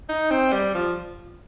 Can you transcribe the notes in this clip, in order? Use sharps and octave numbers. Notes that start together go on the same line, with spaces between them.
D#4
C4
G3
F3